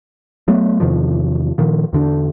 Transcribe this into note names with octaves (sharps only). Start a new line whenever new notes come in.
F#3 A3 B3
E2 C3 D#3 F3
A#2 D#3 F3
E2 D3 D4